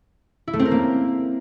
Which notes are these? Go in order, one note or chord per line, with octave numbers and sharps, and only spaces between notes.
E4
A3
C4
A#4
A#3